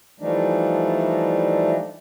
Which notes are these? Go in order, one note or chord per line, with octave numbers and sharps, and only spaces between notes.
E3 F3 G3 A3 D4 D#4